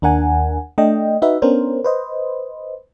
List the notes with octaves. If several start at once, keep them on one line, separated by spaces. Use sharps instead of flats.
D#2 D4 A#4 F#5 G#5
A3 D4 D#5 G5
D#4 F#4 B4 E5
B3 C#4 D4 A#4 C5
B4 C5 D#5